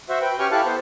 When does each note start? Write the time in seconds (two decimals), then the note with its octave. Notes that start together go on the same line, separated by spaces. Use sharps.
0.09 F#4 C5 E5
0.21 B4 G5
0.39 C#4 G4 G#5 C#6 F6
0.51 E4 G4 A4 F5 A5 F#6
0.65 B3 C5